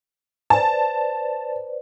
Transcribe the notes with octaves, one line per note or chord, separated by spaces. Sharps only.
B4 C5 D5 A5